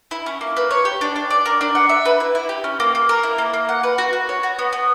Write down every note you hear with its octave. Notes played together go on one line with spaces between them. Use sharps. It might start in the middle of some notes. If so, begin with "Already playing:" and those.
E4
C#4
A#3
B4
C#5
G4
D4
D4
D5
A#4
D4
F#5
E5
B4
E4
E4
G4
C#4
A#3
A#3
A#4
E4
A#3
A#3
F#5
B4
F#4
F#4
C#5
F#4
B3
B3